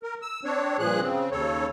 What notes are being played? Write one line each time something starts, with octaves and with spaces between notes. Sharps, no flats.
A#4
E6
C4 D4 C#5
G2 A#2 F3 G#4 F#6
C#3 C4
D#2 C#3 A4 C#5